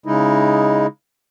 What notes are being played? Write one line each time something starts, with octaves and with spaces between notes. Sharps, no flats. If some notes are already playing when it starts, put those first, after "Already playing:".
C#3 G#3 D#4 E4